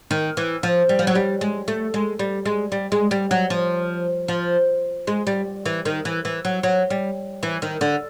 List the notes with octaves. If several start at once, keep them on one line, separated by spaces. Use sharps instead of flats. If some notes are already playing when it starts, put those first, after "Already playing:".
D#3
E3
F3
G3
F3
F#3
G3
G#3
A3
G#3
G3
G#3
G3
G#3
G3
F#3
F3
F3
G#3
G3
E3
D#3
E3
E3
F#3
F#3
G3
E3
D#3
D3